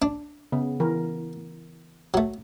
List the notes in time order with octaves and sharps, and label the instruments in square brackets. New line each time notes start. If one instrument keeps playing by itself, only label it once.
[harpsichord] D4
[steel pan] C#3 B3
E3 A#4
[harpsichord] F#3 A3